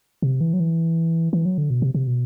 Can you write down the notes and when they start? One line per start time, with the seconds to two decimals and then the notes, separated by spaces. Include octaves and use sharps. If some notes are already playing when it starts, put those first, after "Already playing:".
0.22 C3
0.41 E3
0.53 F#3
0.60 E3
1.33 E3
1.45 F#3
1.58 D3
1.70 B2
1.82 C3
1.94 C3
2.07 B2